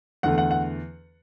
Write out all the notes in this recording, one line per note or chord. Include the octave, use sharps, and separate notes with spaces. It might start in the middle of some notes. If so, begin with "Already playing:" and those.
E2 D3 A3 F#5
F#5
F#5